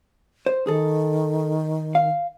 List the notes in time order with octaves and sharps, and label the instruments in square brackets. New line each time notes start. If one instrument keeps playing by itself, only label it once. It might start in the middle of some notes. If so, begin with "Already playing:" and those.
[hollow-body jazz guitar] C5
[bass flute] D#3 [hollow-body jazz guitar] G#4 A4
[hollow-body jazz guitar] F5